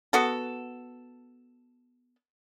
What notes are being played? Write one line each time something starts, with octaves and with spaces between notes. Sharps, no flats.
B3 F#4 A4